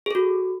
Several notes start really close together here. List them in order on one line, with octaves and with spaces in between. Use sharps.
G#4 A4 F#4